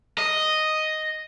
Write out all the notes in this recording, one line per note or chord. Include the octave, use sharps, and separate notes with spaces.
D#5